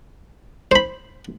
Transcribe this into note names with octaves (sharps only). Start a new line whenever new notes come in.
C5 B5